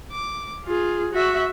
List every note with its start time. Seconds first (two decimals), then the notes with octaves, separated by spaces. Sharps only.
0.12 D6
0.64 F4 G#4
1.13 F#4 E5